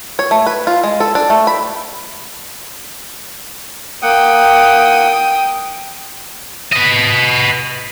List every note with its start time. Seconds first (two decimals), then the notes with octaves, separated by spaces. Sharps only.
0.19 C#5
0.31 A3
0.47 B4
0.67 F4
0.84 G#3
1.00 A4
1.15 D4
1.30 A3
1.47 B5
4.03 A#3 F#5 G5 D#6
6.72 B4 D#5